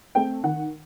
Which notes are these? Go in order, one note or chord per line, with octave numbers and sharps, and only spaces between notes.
A3 C4 G5
D#3 F#5